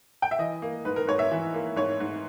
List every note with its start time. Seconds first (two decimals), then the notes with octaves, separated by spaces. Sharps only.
0.22 G5
0.31 E5
0.39 E3 D#5
0.62 A#3
0.85 G#2 B4
0.96 A#4
1.07 G#2 C#5
1.19 E5
1.31 E3
1.54 A#3
1.76 G#2 C#5
2.00 G#2